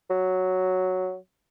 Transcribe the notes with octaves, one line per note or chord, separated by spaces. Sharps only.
F#3